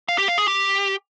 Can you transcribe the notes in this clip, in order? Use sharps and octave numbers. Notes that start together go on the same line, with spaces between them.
F5
G4
F5
G#4
G4